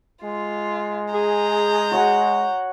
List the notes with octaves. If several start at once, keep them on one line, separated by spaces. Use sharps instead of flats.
G#3 F4
G#4 A#5 G6
F#4 C#5 F#5